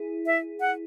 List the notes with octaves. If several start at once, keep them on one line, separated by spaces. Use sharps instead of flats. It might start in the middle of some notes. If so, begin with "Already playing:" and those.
Already playing: E4 G#4
E5
F#5